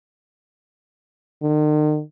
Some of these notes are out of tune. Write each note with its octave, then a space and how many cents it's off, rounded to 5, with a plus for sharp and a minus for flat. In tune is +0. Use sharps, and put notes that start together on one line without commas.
D#3 -45